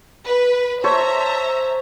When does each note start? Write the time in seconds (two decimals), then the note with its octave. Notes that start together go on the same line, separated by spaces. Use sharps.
0.25 B4
0.84 A4 C5 C#5 E5 A#5